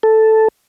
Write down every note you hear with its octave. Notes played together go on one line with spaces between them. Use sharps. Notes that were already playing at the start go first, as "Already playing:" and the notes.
A4